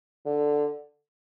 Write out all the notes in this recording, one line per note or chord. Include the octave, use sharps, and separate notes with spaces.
D3